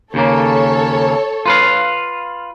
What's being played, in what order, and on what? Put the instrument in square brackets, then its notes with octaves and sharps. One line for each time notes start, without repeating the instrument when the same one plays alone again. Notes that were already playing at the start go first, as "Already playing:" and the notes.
[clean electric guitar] D#2 C#3 A#3 [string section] A4 C#5
[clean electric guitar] F4 B4 F5